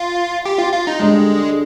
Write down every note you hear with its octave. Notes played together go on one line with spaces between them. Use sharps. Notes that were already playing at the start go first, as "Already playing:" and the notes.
Already playing: F4
G4
F4
F4
D#4
D2 D3 G3 G#3 D4 G4